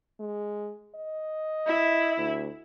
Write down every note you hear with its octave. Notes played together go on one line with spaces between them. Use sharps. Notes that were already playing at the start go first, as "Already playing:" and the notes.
G#3
D#5
E4
D2